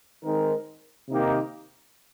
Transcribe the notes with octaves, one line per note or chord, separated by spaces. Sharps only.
D#3 G#3 C4 D#4 A#4
C3 D#3 A#3 D#4 G4